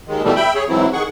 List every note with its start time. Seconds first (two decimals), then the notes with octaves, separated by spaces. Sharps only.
0.08 D#2 D#3 G#3
0.24 B2 E3 G3 A3
0.36 E5 G5 B5
0.55 G#4 C#5
0.69 G#2 E3 F#3 C4 E4
0.93 D#3 G#4 F#5 C#6